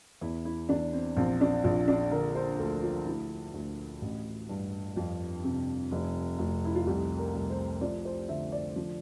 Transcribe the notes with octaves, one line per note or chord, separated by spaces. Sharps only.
E2 E4
E4
E2 D4
C4
A#1 C4
D4
A#1 F4
D4
D3 A#4
C5
D2 A4
F4
D2 E4
D2
A1
G2
F2 F4
C3
F1
F1
E4
F4
C2 G4
A#4
C2
C5
F3 D5
C5
D3 E5
D5
F3